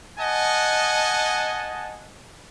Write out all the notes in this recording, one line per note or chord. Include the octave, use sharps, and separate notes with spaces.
D#5 F#5 G#5 A5